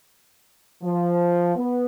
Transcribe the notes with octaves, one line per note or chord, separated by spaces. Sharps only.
F3
B3